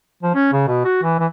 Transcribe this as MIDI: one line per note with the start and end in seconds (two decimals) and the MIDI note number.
0.23 0.35 53
0.35 0.50 61
0.53 0.64 49
0.68 0.84 47
0.85 0.99 66
1.03 1.15 52
1.19 1.26 52